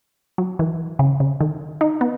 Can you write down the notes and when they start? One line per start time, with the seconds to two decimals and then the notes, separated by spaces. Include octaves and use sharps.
0.38 F#3
0.59 E3
0.99 C#3
1.20 C#3
1.41 D#3
1.81 D#4
2.01 B3